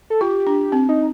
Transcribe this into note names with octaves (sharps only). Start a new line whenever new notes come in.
A4
F4 G4
D4
C4
D#4